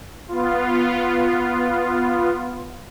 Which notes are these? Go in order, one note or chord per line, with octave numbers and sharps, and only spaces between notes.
B3 F4